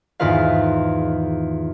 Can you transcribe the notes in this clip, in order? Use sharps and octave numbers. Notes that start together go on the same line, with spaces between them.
E2 G#2 D#3 F4 B4 F5